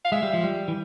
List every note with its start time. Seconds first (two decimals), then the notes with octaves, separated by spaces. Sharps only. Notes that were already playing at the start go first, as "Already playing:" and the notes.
0.05 F5
0.12 G#3 E5
0.23 G3
0.34 F3
0.44 G3
0.68 E3